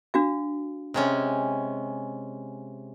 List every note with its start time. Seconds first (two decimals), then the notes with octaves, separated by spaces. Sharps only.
0.14 D4 F#4 F5
0.94 C3 G#3 C#4